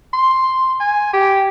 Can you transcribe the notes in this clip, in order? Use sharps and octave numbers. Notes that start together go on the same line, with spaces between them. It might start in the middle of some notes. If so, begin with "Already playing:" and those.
C6
G#5
G4